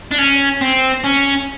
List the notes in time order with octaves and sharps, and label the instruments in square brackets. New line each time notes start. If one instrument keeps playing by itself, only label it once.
[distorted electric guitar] D4
C#4
C4
C#4